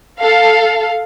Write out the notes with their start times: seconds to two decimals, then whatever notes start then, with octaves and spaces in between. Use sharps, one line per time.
0.19 A4 F5